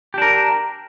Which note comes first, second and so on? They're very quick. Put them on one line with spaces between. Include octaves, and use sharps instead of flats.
G4 D4 A#4